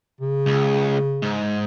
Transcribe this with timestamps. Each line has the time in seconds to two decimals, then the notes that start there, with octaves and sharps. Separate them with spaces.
0.21 C#3
0.46 C#2
1.22 G#2